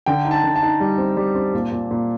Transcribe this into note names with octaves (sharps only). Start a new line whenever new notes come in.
D3 G5
D#4
A5
D3
A5
D#4
G3
C4
G3
C4
A#2
A#2
A#2